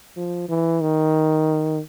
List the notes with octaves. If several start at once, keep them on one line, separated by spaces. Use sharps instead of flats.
F3
E3
D#3